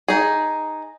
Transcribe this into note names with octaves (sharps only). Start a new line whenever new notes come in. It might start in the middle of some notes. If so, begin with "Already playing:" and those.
D#4 G#4